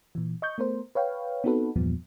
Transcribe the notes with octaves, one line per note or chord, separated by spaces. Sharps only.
A#2 E3
D#5 C#6 G6
A3 B3 A#4 C5
B4 C#5 F5 G5
B3 C4 D#4 F#4 A4 B4
E2 G2 A#2 F3 G3 B3